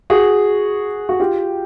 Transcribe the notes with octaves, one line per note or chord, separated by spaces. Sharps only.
F#4 G#4
F#4
F4 G4